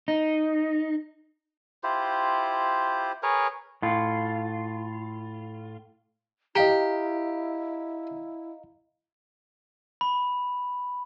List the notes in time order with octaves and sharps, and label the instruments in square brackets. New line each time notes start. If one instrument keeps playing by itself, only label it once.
[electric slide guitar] D#4
[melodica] E4 F4 G4 C5
G#4 A#4 B4 C#5
[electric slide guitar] A2 F4
[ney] E4 [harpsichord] G4 [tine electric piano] D#5 F5 A#5
[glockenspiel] B5